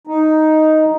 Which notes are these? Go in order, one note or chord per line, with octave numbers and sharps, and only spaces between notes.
D#4